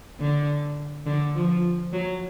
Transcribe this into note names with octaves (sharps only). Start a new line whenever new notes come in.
D3
D3
F3
F#3